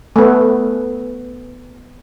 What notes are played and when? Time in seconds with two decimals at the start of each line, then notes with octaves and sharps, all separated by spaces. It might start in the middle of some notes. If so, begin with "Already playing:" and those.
0.16 A3 B3